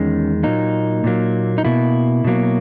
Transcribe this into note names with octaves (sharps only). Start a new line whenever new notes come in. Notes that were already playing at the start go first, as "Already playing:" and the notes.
Already playing: E2 D#3 G#3 C#4
A#2 F#3 A#3 D#4
A#2 F#3 A#3
D#4
B2 A#3 E4
B2 F#3 A#3